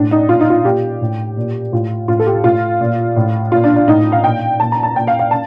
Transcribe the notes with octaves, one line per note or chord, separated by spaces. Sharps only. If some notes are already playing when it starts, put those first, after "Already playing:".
Already playing: A2 D4
D#4
A#2 F4
D#4
F4
A#2 G4
A2
A#2
A2 F4
A2 F4
A4
G4
A2 F4
A#2
A2
A#2 F4
D4
D4
A2 D#4
F5
A#2 G5
A#2 A5
A#5
A5
A#2 G5
F5
F5
A5